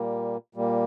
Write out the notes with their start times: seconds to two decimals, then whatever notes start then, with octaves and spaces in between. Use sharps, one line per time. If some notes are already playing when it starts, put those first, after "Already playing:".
Already playing: A#2 G3 A#3
0.55 A#2 G3 A#3